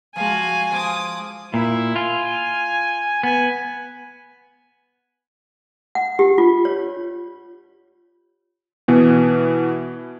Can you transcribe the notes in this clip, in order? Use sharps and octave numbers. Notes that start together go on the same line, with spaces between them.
F3 G#3 F#4 F5 G#5
F3 C5 D6 D#6
A#2 E4
F4 G#5
B3 G#5
F#5
G4
F4
C#5
B2 E3 B3